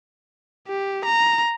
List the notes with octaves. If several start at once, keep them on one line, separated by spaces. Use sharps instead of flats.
G4
A#5